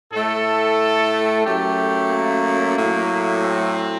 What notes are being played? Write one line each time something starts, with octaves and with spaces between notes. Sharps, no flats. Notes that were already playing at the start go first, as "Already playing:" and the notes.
A2 A3 A4
F#2 F#3 A3 G4
A#3
A2 F#3 A3
C4